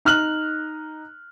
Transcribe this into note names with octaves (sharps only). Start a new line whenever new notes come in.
D#4 F6 F#6 F#7